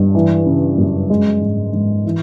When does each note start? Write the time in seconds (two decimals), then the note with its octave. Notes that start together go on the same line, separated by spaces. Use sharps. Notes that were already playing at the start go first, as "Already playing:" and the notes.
Already playing: G2
0.15 E3
0.46 C#3
0.78 F#2
1.10 G#3
1.41 G#2
1.73 G#2
2.05 E3